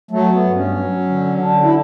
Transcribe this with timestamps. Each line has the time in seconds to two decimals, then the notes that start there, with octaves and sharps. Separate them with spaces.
0.11 F#3 A3
0.32 B3
0.44 G2
0.55 C#4
0.77 F#3
1.09 D3
1.41 D3 D4
1.64 E4